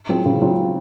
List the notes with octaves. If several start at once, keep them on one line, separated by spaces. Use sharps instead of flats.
F#3 C4 F4 G#4
C#3
F#3 C4 F4 G#4